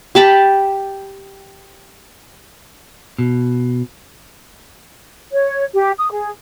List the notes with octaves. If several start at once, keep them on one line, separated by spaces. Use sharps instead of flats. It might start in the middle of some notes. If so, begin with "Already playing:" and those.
G4 A5 B5
B2
C#5
G4
D#6
G#4